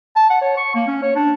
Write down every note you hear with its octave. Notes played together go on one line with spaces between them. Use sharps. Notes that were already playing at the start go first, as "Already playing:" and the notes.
A5
F#5
C#5
C#6
A#3
C#4
C#5
D4